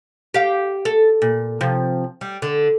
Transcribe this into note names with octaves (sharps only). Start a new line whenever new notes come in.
G4 F5
A4
A#2
C3 F3
G3
D3